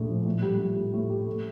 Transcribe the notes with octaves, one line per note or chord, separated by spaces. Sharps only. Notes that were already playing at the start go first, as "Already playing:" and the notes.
Already playing: A#1 A2 A3
F3
A2
G3
G3
A2
A2
G4
A3